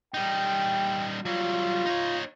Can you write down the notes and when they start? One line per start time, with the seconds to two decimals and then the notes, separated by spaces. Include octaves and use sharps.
0.14 G3 D#4 G5
1.25 F#3 G3 F4
1.86 D#4 C#5